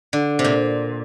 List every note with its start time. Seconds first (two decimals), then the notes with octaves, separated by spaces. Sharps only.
0.13 D3
0.39 C3
0.44 A#2